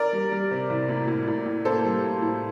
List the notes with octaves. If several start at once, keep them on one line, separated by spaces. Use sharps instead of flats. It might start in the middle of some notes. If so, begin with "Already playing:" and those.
Already playing: A#4 D5
G3
G3
C3
C2
A2
A2
A2
A2
A#3 A4 C5
G3
A2
A2